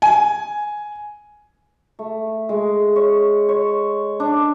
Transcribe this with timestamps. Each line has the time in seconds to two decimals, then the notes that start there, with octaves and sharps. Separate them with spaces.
0.02 G#5
1.99 A3
2.49 G#3
2.96 C#5
3.49 C#5
4.20 D4